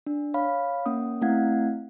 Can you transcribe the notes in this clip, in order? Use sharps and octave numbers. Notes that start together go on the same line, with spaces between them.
D4
C#5 F5 B5
A#3 C#4 F#5 D#6
A3 C4 E4 F5 F#5 G#6